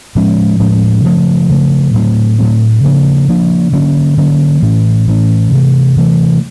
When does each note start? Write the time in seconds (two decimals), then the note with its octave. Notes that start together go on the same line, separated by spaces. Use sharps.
0.15 A2 F3 G#3 C#4
0.59 A2 F3 G#3 C#4
1.04 C#3 F3 A3
1.49 C#3 F3 A3
1.94 A2 F#3 A3 C4
2.39 A2 F#3 A3 C4
2.84 C#3 F3 A#3 D4
3.28 C#3 F3 A#3 D4
3.73 D3 F#3 A#3 C#4
4.17 D3 F#3 A#3 C#4
4.62 A2 E3 A3 C#4
5.07 A2 E3 A3 C#4
5.52 C3 E3 A3
5.96 C3 E3 A3